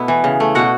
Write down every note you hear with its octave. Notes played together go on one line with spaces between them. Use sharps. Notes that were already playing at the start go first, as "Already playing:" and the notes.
Already playing: B2 A3 B3 E4
E3
C#3
A3
B2 F#4 F#5